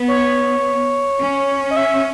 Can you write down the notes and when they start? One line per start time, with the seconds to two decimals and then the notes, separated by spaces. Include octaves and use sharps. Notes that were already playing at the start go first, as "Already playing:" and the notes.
Already playing: B3
0.08 C#5
1.20 C#4
1.71 D#5
1.76 E5